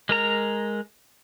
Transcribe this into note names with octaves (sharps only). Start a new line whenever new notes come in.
G#3 A#4 A#5